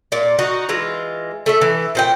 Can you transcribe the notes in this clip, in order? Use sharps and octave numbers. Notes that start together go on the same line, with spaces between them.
A#2 D5
D#4 F#4
E3 G#3 F4
A3 A4 E5
E3
A#2 C5 G5